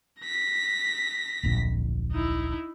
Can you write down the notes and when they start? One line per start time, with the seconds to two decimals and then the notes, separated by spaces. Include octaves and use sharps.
0.20 A#6 B6
1.43 D1 A#1 F2
2.12 D#4 E4